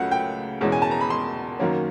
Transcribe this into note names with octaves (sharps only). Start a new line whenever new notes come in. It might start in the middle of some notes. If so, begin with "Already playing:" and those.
Already playing: C#2 C#3 F#3 A3 F#5
G5
E2 B2 G#3 C#4
G#5
A5
A#5
B5
C6
F#2 D#3 F#3 A#3 C#4